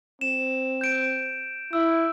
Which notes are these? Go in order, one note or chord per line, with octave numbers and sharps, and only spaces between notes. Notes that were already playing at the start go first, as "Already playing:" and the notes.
C4 E7
G6 D7
E4 E6